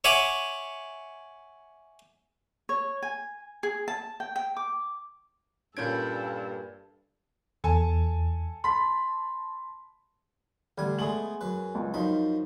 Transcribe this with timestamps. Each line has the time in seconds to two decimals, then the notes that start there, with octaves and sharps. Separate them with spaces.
0.04 C#5 E5 F#5 G#5 D6
2.69 C#5
3.02 G#5
3.63 G#4
3.88 A5
4.20 G5
4.36 G5
4.57 D6
5.77 G2 A#2 C#4 A4 B5 G6 G#6 D7
7.64 E2 A4 G#5 A5
8.64 A5 B5 C6 B6
10.78 A1 D3 G3 G#5
10.99 G#3 A3 B3 G#4 F#7
11.41 F#2 B4
11.75 C#2
11.94 F#2 F3 D#4 B5